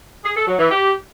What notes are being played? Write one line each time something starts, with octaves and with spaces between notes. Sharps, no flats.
G#4
A4
F#3
E3
G4